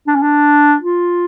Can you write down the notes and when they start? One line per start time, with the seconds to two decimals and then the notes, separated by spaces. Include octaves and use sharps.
0.07 D4
0.15 C#4
0.22 D4
0.81 F4